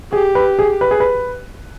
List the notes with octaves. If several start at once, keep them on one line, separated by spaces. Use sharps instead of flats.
G4 G#4
B4
G#4
B4
G#4
B4